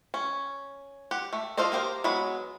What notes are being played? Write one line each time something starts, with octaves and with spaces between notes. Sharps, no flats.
C#4
G4 F#5
A3
F4 A4 C5 D5 D#5
A#3 G4 A#4 C5
F#3 G#3 B3 B5